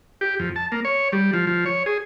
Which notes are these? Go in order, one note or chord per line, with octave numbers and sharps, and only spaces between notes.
G4
F2
A5
A#3
C#5
G3
F3
F3
C#5
G#4